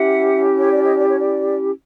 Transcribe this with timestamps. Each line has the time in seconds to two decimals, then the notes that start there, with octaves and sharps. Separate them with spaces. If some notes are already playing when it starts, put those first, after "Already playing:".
Already playing: C#4 E4 G4 E5 F#5
0.60 C#5
0.71 D5
0.83 C#5 D#5
0.96 D5
1.09 C#5
1.20 D5